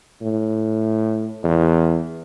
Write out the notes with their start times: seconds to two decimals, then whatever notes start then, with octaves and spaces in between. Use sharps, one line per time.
0.21 A2
1.44 E2